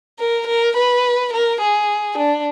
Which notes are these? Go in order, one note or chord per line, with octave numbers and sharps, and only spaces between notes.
A#4
A#4
B4
A#4
G#4
D4